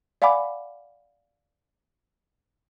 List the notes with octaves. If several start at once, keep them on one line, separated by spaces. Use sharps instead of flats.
D5 F5 F#5 G#5 B5 D6